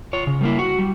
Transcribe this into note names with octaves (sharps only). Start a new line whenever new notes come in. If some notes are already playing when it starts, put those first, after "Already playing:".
F4 C#5
C#3
G3 A#3 E4
F#4
G3